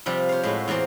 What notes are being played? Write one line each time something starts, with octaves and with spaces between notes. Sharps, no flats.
C3 F3 G3
C5 C#5 F5
A2 G#3 A3 F#4
E2 E3 A#3 C4 C5